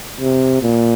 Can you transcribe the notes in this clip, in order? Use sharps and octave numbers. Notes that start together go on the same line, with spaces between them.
C3
A#2